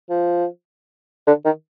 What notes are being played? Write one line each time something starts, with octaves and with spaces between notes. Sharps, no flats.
F3
D3
D#3